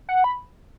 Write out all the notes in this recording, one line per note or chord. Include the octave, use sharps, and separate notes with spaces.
F#5
B5